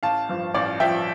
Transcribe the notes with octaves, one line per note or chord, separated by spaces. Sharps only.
A1 F5 A5
G2 F3
A1 D5 F5
G2 F3 E5 G5